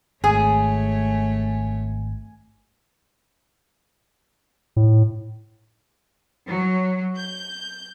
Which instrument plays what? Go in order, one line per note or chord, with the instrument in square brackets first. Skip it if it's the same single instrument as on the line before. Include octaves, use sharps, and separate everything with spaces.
[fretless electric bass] G#1 [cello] A3 C#5 [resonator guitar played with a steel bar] G#4 [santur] G#5
[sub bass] A2
[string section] F#3
G6